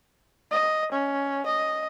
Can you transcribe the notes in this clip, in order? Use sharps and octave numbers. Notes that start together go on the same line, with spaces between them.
D#5
C#4
D#5